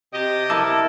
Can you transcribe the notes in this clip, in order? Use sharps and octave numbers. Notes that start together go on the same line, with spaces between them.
C3 G4 D#5
E4 A4 A#4 A5 D6